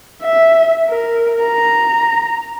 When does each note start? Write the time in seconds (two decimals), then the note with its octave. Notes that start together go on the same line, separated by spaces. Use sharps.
0.22 E5
0.89 A#4
1.43 A#5